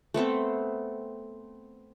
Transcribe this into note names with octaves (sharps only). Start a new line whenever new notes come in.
A3 B3 C4 A4